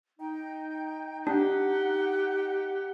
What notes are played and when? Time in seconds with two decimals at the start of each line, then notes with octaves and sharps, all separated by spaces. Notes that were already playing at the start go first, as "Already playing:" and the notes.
0.20 D#4 G5
1.27 D4 G4 F#5